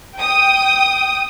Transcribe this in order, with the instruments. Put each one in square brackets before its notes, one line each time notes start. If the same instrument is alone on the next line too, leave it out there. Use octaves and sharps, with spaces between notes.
[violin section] G5 D#6